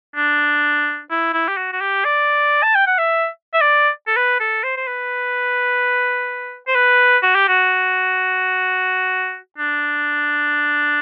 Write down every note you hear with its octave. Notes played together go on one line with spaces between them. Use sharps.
D4
E4
E4
G4
F#4
F#4
G4
D5
A5
G5
F#5
E5
E5
D5
A4
B4
A4
C5
C5
B4
C5
B4
F#4
G4
F#4
D4